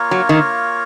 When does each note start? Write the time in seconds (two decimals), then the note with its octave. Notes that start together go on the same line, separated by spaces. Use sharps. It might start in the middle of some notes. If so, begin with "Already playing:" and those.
Already playing: A#3 F4 A#4 C#5
0.11 F#3
0.29 D#3